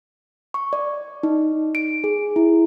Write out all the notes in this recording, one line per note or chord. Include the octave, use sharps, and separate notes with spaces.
C#6
D5
D#4
D7
G#4
E4